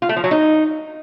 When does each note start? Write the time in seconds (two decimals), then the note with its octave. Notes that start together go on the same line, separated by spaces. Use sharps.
0.02 F4
0.09 A3
0.17 F3
0.24 F#3
0.31 D#4